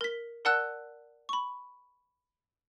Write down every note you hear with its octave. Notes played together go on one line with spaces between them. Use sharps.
A#4 B6
A#4 D5 F#5 A5 E6 F#6
B5 C#6